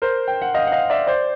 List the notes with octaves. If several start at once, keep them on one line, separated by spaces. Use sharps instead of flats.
A#4 C5
G5
F#5
D#5 F5
F#5
D#5 F5
D5 E5
C5 D5